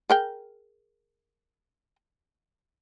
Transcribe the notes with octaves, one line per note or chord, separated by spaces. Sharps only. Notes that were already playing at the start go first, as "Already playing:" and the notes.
G#4 A#4 G5